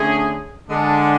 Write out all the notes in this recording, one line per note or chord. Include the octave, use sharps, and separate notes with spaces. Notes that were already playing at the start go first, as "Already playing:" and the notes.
Already playing: D3 A3 C#4 G#4
D3 G#3 D4